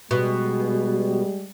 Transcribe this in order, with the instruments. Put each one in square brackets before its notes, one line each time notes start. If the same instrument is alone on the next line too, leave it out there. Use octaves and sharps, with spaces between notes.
[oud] B2 [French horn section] G3 G#3